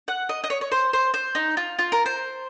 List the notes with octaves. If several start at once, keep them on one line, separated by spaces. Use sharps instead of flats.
F#5
D#5
D#5
C#5
C#5
C5
C5
C5
D#4
F4
F4
A#4
C5